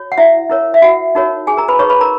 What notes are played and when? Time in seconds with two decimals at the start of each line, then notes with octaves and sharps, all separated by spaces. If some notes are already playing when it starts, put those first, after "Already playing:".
Already playing: F#4 C#5
0.12 F#5
0.18 E4 E5
0.50 E4 A#4 C#5
0.74 E5
0.82 F#4 F#5
1.15 D#4 F#4 A#4 C#5
1.47 G#4 G#5
1.57 A#4 A#5
1.68 B4 B5
1.79 D#4 G#4 B4 C#5 C#6
1.90 B4 B5
2.01 A#4 A#5